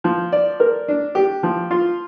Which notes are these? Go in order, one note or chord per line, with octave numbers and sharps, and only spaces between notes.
F3
D5
A#4
D4
G4
F3
F4